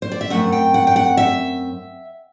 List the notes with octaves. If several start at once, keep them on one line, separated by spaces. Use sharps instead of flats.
C5
D5
E5
F#2 F#3 A3 C4 F#5
G5
F#5
G5
F#5
E5